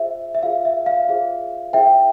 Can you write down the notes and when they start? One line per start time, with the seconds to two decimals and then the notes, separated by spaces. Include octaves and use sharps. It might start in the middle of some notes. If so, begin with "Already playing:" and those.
Already playing: F4 G#4 C5 E5
0.35 E5
0.43 F4 G#4 C5 F5
0.65 E5
0.86 F5
1.08 F4 G#4 C5 F5
1.73 E4 G#4 C5 E5 G5